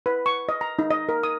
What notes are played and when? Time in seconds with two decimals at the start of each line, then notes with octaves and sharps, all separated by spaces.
0.06 B4
0.26 C#6
0.49 D#5
0.61 A#5
0.79 D#4
0.91 D#5
1.09 A#4
1.23 D#6